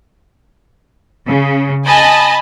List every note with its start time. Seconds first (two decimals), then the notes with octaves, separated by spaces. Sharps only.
1.27 C#3
1.86 D#5 G#5 A5 B5